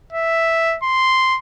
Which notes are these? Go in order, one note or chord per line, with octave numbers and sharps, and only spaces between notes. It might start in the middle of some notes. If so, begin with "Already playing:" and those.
E5
C6